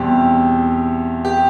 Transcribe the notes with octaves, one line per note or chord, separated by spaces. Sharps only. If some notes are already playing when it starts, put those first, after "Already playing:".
Already playing: E2 B2 G3 C4 G4
G4